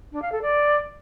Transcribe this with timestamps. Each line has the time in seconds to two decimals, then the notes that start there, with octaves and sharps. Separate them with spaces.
0.12 D4
0.22 F5
0.32 A4
0.42 D5